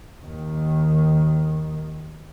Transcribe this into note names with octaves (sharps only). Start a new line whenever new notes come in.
D#2 D#3